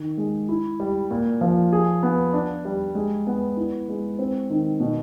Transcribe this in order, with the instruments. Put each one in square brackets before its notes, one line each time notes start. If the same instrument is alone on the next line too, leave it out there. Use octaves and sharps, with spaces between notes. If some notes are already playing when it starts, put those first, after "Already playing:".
Already playing: [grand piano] D#3
G#3
E4
G3
A#2
F3
G#4
B3
D4
G3
G#3
B3
E4
G#3
C4
D#3
B2